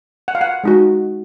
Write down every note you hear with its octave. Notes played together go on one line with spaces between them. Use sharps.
F#5
F5
F#5
G#3 D#4 F#4